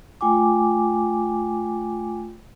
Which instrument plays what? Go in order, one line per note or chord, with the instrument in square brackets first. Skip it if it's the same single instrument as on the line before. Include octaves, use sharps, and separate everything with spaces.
[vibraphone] A3 F4 G5 G#5 D6